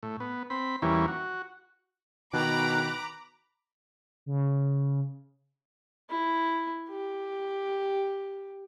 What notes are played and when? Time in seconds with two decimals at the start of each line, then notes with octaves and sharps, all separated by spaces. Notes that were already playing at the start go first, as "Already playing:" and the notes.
0.03 A2
0.20 B3
0.50 C4 B5
0.82 E2 E3 G3 A#3 C#4
1.08 F#4
2.33 B2 D#3 A#5 B5 D6 F#6
4.26 C#3
6.10 E4
6.89 G4